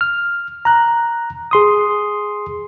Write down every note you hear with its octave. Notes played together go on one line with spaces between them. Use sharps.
F6
A#5 F#6
G#4 C6 D#6